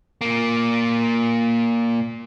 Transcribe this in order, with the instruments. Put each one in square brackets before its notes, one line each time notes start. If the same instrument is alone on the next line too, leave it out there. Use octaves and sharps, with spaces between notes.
[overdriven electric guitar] A#2 A#3